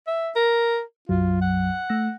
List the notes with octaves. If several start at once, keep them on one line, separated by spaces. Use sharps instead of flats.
E5
A#4
B1 F#2 F#3 F4
F#5
A3 E6 A#6